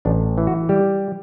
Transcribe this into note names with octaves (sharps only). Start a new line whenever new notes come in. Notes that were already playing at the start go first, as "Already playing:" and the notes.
A1 D4
E3
F#4
G3 G4